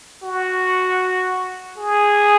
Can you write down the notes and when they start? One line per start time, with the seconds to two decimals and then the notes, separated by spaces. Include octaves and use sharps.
0.23 F#4
1.78 G#4